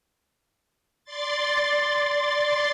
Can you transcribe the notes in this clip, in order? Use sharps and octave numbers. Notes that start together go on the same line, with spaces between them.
D5 C6 A6